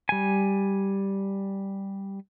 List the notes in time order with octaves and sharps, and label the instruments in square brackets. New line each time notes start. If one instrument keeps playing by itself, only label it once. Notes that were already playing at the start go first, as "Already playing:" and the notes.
[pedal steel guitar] G3 G#5